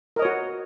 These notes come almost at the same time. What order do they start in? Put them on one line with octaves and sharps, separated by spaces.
A#4 D#5 C#5 F#4